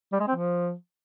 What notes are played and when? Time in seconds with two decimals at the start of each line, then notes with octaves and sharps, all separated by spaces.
0.12 G3
0.20 G#3
0.28 C4
0.35 F3